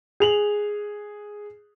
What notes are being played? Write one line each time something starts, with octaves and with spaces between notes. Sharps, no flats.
G#4 F7 F#7